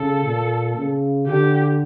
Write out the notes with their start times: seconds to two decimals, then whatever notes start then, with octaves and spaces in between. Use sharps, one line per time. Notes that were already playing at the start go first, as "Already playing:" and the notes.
Already playing: C#3 A4
0.24 A#2
0.76 C#3
1.27 D3 G4